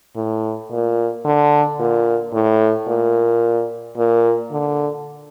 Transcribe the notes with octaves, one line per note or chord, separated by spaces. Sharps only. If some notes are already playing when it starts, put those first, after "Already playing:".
A2
A#2
D3
A#2
A2
A#2
A#2
D3